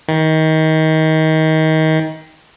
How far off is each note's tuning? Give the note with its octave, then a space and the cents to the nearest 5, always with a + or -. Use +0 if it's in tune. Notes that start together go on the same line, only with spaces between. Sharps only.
D#3 +25